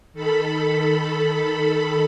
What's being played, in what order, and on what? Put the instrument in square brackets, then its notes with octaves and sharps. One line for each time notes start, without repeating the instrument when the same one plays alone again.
[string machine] D#3 A4 B5